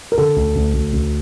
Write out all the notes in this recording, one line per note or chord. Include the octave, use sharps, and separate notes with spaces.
A#4
D3 A4
D2
D2
D2
D2